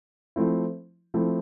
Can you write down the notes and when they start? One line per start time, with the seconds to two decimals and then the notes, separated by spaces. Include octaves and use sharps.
0.36 F3 A3 C4 E4
1.14 F3 A3 C4 E4